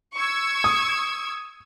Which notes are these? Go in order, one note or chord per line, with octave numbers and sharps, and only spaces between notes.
C#6 E6 G#6
D#6